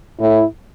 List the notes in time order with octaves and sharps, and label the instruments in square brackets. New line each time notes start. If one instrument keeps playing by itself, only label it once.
[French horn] A2 [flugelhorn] E4